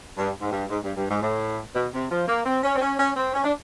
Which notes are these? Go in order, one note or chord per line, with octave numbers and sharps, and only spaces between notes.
G2
G#2
G2
G#2
G2
G2
G#2
A2
B2
C3
F3
A#3
C4
C#4
C4
C#4
C#4
C4
C#4
D4